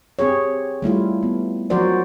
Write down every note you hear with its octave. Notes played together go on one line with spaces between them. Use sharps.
C4 G4 G#4 C#5
G3 A3 E4 F4
B3
F3 F#3 F#4 A#4 C5 D5